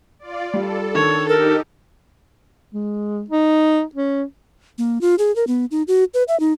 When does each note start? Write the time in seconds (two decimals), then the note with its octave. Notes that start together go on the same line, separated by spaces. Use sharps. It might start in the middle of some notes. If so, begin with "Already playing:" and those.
0.19 F4 D5
0.54 G3 A4
0.95 D#3 D4 C#5 A5
1.29 D#4 G4 A4 A#4
2.73 G#3
3.30 D#4
3.95 C#4
4.78 A#3
5.01 F4
5.19 G#4
5.36 A#4
5.47 B3
5.71 D#4
5.88 F#4
6.14 B4
6.28 E5
6.40 D#4